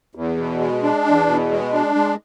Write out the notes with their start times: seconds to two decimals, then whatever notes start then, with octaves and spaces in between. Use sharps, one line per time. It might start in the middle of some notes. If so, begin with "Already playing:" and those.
0.15 E2
0.37 B2
0.60 G#3
0.83 D4
1.06 E2
1.28 B2
1.51 G#3
1.73 D4
1.95 G#3